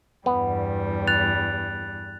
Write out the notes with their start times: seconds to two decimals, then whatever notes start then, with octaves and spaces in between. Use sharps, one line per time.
0.26 E2 G2 G3 B3
1.08 F#6 A6 F7